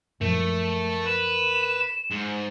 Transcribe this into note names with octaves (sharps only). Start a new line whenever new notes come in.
F#2 A#2 F3 A3 A#4
B4 E7
G#2